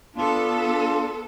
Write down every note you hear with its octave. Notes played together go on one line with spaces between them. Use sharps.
B3 D4 F4 A4